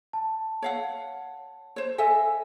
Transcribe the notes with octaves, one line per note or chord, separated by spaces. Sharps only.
A5
C#5 F5 F#5
C5 C#5
A4 D#5 E5 G#5